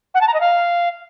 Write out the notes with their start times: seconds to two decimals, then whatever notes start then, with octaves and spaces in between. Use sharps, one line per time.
0.15 F#5
0.21 A5
0.28 A#5
0.34 D#5
0.41 F5